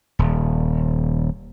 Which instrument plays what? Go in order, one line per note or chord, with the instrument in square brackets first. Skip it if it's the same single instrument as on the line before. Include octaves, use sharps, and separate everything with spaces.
[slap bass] D#1